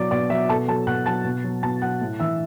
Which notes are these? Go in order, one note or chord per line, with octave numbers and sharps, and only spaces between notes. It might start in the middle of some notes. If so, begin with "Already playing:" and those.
Already playing: B2 F#3 D5 D6
B2 D5
F#3 E5
B2 A4 A5
F#3 A4 A5
B2 F#5 F#6
F#3 A5 A6
B2
F#3
B2 A5 A6
F#3 F#5 F#6
A2
E3 E5 E6